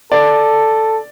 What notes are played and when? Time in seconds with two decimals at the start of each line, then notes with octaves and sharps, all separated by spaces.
0.12 A4 D5